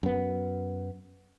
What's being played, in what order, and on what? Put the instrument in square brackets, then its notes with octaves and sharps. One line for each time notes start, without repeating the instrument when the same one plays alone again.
[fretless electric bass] F#2 B3